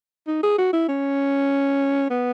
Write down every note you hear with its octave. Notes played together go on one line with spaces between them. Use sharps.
D#4
G#4
F#4
E4
C#4
B3